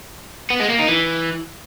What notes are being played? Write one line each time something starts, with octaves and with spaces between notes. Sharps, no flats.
B3
G#3
A#3
D#4
E3